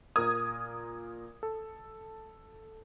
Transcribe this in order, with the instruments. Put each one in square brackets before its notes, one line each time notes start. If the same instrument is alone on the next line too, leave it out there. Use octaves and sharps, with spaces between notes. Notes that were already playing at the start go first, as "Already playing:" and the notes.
[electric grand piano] A#2 A#4 G#6 [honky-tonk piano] D#6
[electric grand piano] A4